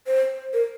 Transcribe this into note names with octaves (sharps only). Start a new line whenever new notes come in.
C5
A#4